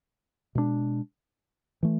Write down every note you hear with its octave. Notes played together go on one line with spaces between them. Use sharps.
B2 G#3 B3 D4
E3 A3